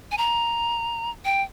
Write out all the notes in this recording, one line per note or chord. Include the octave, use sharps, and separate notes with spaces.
G#5
A#5
G5